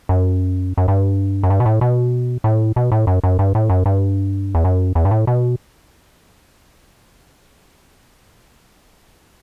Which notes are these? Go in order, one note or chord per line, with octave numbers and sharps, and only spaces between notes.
F#2
F#2
G2
F#2
G2
B2
A2
B2
A2
B2
A2
F#2
F#2
G2
A2
F#2
G2
E2
F#2
E2
G2
A2
B2